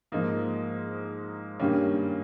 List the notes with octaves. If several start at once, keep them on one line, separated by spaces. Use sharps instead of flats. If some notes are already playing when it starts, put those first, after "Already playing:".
G#2 F3 A#3 D#4
G2 D#3 G3 A#3 C#4